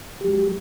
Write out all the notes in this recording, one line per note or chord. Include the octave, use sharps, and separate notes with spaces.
F#3 G#3 G4